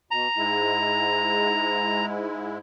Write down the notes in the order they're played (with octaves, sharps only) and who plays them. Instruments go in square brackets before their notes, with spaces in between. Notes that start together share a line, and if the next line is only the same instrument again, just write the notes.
[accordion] B2 [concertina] A#5
[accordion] G#2 G#3 E4